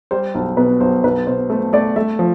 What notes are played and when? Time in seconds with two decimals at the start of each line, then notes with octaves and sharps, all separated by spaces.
0.11 G3 C5
0.35 B1 C5
0.57 B2 B4
0.80 B1 C5
1.04 B1 B4
1.27 B2 C5
1.50 A3 C5
1.73 A3 D5
1.96 A3 E5
2.19 F3